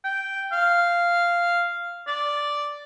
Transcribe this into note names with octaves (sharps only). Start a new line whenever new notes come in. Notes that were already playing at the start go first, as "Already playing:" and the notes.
G5
F5
D5